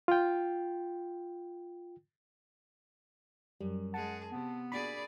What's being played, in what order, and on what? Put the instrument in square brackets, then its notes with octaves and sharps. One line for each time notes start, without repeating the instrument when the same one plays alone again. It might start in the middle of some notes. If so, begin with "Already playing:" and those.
[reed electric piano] F4 G5
[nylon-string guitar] F#2 [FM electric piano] G3
[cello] G#3 G#4 [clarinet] F#5 [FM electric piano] A5
[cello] C3 [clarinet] B3
[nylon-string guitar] A#3 D4 F#4 [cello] G#4 D5 [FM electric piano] B5